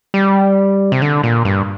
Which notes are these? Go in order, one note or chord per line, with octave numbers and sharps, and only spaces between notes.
G3
C3
D3
A#2
G2